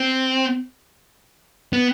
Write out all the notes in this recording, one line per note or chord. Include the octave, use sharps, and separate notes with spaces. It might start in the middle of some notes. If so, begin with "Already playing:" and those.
Already playing: C4
B3